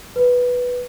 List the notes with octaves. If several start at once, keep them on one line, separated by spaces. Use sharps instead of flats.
B4